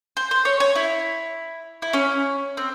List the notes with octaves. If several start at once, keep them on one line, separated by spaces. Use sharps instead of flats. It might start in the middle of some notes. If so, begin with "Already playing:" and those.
C5
C5
C#5
C#5
E4
E4
C#4
C4